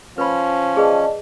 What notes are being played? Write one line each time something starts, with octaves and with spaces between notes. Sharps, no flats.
F3 C#4 B4 B5
G#4 B4 D5 D#5 A5